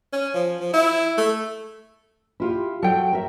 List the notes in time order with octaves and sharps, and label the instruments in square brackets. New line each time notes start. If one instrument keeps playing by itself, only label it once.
[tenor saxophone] C#4
F3
F3
E4
A3
[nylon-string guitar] E4 F4 G4
[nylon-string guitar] F#3 [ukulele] A4 G5
[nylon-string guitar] A#4 E5